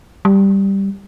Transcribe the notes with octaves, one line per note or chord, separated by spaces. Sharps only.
G3